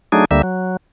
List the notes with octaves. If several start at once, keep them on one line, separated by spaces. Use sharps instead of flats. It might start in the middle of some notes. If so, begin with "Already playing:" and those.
F#3 A3 D4 D#4 G#4
D2 D3 G3 A#3 E5
F#3